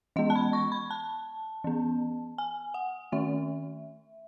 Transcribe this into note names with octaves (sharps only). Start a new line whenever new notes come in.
E3 G#3 B3 D#5
A5
B5
C#6
B5
A5
E3 B3
G#5
F#5
D#3 A3 C#4 E5